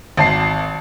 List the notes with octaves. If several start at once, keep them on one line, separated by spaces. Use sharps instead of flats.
G#1 A5 C7